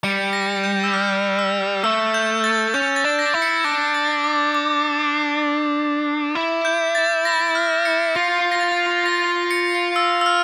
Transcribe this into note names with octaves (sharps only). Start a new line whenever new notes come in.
G3 C#7
A#6
G6
E6
F6
E6
A3 E6
G6
A6
C#4 G6
A6
D4
A#6
E4
C#7
D4 A#6
A6
D6
D6
E4
G6
A6
A#6
F6
C#7
F4 A#6
A#6
A6
A#6
C#7
E6
E6
F6